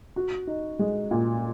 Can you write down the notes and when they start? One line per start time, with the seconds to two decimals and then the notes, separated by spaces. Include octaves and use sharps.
0.16 F#4
0.47 D#4
0.79 G#3
1.11 A#2